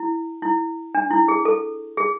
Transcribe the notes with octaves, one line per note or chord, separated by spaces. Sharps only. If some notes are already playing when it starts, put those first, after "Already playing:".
Already playing: E4
E4
D4
E4
G#4
A4
G#4